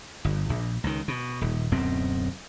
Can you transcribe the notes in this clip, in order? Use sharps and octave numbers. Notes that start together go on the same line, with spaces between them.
G1
A#1
C#2 D#3
B2
D#1
D1 F#2 B2 C4